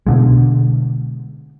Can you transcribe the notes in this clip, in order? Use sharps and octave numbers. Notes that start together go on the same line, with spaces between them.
B2 D3 G#3